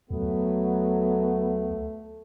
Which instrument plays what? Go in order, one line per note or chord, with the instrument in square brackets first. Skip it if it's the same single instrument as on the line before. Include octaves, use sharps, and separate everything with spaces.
[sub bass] D2 [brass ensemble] F#3 B3 [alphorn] A3